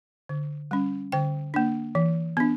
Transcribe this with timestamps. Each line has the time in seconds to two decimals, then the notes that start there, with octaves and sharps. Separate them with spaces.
0.29 D3
0.71 G3 C#4
1.12 D3 G5
1.54 A#3 D4
1.95 E3
2.37 B3 D4